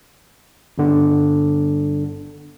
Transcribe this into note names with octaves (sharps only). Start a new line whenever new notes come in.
G1 D3